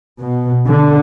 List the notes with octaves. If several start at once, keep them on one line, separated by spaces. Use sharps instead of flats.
B2
D3